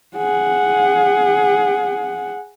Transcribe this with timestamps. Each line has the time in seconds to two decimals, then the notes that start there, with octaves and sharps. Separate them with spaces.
0.17 G#4 F#5